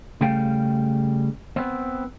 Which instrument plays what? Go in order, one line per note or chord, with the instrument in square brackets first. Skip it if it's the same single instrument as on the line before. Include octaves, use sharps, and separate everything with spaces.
[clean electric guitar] C#3 G3 A3 F5 G5
B3 C4